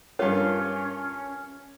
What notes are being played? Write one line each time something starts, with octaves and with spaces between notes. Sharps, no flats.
G2 C#4 F4 A#4 C#5